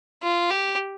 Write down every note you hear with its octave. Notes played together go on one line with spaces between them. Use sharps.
F4
G4